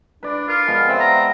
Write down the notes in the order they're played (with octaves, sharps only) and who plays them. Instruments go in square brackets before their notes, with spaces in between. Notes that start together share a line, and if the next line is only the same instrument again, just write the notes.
[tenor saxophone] D4 [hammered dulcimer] B4 D5
[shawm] F4 [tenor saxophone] A#4
[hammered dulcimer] F3 G#3 B3
[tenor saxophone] C4 [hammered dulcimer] B4 E5 F#5
[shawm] A#5